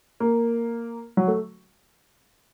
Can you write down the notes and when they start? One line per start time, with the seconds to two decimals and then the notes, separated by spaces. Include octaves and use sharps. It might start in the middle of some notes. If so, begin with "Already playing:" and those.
0.20 A#3
1.17 F#3
1.28 A3